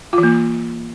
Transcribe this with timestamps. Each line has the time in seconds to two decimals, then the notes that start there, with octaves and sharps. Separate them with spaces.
0.13 F4
0.18 E3
0.23 A#3